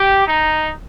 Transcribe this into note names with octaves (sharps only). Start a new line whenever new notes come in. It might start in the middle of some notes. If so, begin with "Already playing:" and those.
Already playing: G4
D#4